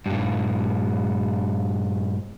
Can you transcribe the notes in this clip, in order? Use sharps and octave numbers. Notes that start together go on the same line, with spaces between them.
G2 A#2